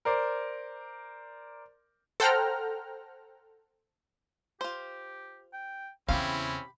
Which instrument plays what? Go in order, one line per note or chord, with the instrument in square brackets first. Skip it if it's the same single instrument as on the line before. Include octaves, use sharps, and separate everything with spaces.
[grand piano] A#4 C5 D5
[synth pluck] A4 C5 F#5 G5 A#5 F6
[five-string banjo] F4 C5 [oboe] G4
[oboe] G5
[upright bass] E2 C#3 [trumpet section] C4 C#4 E4 [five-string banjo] G4 F5 [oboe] B5